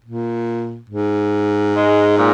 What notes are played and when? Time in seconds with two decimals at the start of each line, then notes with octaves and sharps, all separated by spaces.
0.05 A#2
0.90 G#2
1.76 G#3
2.18 A#2